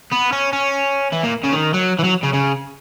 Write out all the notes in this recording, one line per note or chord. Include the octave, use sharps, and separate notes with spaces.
B3
C#4
C#4
E3
A#2
C#3
D#3
F#3
E3
F#3
C#3
C#3